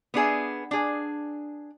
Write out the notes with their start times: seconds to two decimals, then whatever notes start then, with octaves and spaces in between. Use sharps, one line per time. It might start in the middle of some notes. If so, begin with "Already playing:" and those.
0.14 B3 D4 G#4 E5
0.71 D4 G#4